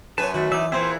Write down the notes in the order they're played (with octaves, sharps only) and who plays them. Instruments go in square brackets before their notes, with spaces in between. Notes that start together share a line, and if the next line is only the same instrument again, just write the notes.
[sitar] F#2 B4 [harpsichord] C#5 G#5 [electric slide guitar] A5
[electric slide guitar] D#3 A3 [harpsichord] F#4
[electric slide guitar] E3 [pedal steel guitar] D#4 E5 [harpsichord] D5
[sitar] A#2 E3 [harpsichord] C4 [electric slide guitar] E4 G#4 [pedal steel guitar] B4 C5 E5